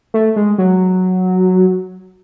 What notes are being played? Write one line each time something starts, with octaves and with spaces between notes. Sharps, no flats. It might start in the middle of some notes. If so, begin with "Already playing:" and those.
A3
G#3
F#3